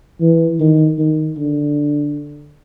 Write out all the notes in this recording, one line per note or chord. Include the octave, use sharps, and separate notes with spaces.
E3
D#3
D#3
D3